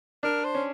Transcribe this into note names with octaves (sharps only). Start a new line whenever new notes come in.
D4 A#4
C5
C#4